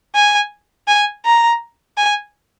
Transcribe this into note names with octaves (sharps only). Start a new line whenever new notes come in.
G#5
G#5
A#5
G#5